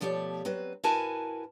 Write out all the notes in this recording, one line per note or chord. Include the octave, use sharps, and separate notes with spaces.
B2 F3 A3 G4 C#5 D5
F#3 C4 B4
E4 F#4 A#4 B4 G#5 A5